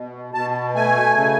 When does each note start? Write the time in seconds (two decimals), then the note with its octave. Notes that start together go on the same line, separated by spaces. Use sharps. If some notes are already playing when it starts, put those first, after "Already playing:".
Already playing: B2
0.34 B2 A5
0.75 A3 G#5
1.16 C#3